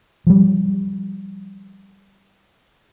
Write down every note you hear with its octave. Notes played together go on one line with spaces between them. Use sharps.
F3 G3